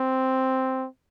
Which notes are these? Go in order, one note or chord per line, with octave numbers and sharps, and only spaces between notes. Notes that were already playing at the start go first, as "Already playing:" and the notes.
Already playing: C4